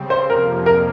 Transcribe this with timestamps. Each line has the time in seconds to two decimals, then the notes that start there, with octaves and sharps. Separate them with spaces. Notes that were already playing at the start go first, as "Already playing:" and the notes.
Already playing: C#3 G3 C4
0.10 C5
0.29 F2 C3 F3 A#3 A#4
0.66 A#4